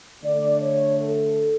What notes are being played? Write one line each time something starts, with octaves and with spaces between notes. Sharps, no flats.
D3 A3 D5
C#5
A4